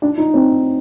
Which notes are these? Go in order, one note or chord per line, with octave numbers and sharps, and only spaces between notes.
D4
D#4
C4